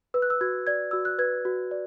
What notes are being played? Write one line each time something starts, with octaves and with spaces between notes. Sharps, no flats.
B4 E6
F#6
E6
F#4 G#6
D5 G#6
F#4 E6
F#6
B4 G#6
F#4
D5